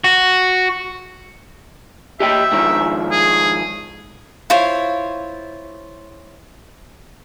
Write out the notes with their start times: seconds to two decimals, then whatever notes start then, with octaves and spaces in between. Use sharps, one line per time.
0.04 F#4
2.20 G4 D#5 E5 G5
2.52 G#2 D#3 F3
3.11 G#4
4.50 E4 F4 C5 C#5